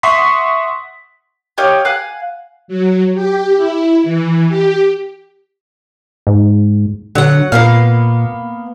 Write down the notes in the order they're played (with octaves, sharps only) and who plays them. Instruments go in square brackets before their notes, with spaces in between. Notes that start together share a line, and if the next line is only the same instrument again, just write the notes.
[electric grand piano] E5 F#5 C6 C#6 D#6 B6
[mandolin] G4 C#5 D#5 F5
F5 F#5 G#5 F#6
[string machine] F#3
G4
E4
E3
G4
[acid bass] G#2
[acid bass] D3 [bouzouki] F#3 F#5
[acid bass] A#2 [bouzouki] A#3 B3 F5